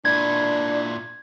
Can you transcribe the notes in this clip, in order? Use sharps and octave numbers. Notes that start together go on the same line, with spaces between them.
A#2 D4 E4 G#6